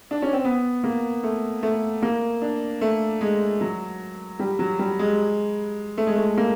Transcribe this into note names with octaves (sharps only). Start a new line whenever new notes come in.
D4
C#4
C4
B3
A#3
A3
A3
A#3
D4
A3
G#3
F#3
G3
F#3
G3
G#3
A3
G#3
A3
A#3